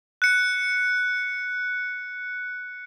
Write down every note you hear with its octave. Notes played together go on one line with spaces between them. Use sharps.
F#6 C#7